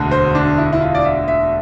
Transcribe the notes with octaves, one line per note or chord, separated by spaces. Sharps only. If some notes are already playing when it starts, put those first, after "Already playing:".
Already playing: E1 D2 D3
C5
D4
E4
E4
F4
D5
E5
E5